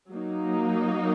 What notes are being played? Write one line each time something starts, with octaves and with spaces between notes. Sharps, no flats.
F#3 A#3 D#4